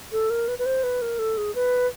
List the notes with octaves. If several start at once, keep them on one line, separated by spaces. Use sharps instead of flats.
A4
A#4
B4
B4
C5
B4
A#4
A4
G#4
B4